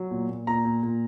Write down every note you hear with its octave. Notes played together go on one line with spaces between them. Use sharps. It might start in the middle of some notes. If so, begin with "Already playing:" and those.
Already playing: F#3
A#2
A#2
A#2 A#5
A#2
A#2